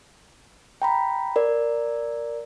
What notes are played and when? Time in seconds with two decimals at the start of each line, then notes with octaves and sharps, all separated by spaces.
0.82 G5 A#5 B5
1.36 A#4 D5